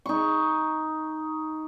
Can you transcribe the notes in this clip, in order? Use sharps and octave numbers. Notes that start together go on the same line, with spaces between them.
D#4 C#6